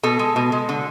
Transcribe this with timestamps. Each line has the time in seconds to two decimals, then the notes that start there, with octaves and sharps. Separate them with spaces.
0.03 B2 A4
0.19 G#3
0.36 B2
0.52 G#3
0.69 D3